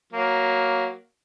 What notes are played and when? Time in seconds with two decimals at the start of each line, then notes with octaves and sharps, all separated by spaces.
0.13 F#3 A#3